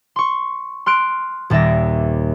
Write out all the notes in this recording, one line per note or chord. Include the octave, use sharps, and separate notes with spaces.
C6 C#6
C6 F6 F#6 D7
D#1 D#2 D5 E5 A#6